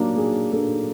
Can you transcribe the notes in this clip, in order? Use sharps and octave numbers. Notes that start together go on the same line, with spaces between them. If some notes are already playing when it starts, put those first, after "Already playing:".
Already playing: F#3 A#3 D4 G4
F#3 G#4
A#3 D4 A4